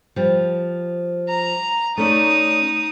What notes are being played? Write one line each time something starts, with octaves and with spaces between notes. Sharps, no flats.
F3 G3
A#5
A3 C#4 D#4 D5 D#6